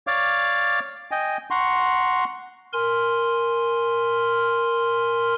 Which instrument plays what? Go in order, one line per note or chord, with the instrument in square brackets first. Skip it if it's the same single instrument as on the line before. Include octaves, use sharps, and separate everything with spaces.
[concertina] C#5 D5 F5 D6
D#5 G5 G#5
F#5 A#5 C6 C#6
[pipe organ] A#4 G#5 C6 F6